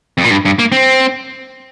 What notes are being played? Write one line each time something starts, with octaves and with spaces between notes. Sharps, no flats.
F2
A#2
G2
G2
A#3
C4